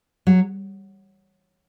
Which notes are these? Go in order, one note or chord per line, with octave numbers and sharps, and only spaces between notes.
F#3